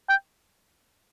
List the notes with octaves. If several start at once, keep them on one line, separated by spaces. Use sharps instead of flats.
G5